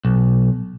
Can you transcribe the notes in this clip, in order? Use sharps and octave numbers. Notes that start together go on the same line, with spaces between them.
B1